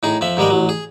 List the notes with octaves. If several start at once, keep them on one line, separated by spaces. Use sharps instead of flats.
A2 D#4 G#4
F2 F3 E5
G#2 D#3 G3 G#3 D#5
A1 F#3
G#4